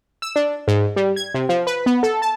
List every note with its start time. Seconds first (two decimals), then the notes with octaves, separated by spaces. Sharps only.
0.22 E6
0.36 D4
0.68 G#2
0.96 G3
1.16 G#6
1.34 C3
1.49 F3
1.67 B4
1.86 B3
2.03 A4
2.22 A5